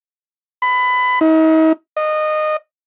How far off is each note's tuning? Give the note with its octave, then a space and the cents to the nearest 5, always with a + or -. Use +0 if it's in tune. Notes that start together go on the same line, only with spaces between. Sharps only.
B5 +20
D#4 +40
D#5 -20